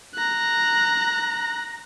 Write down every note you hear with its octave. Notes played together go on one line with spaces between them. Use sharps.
A#5 F#6